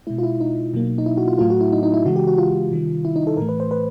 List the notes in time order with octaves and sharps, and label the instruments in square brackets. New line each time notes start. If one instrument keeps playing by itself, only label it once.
[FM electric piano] B2 G#3 E4
F4
E4
D#4
B2 F#3 A#3
D#4
E4
F#4
F4
A2 F#3 A3 F4
F#4
E4
D#4
D#4
E4
C#3 E3 G#3 F#4
G4
F#4
F4
C3 D#3 G3
E4
D#4
A4
A2 E3 A3 A#4
B4
C5
B4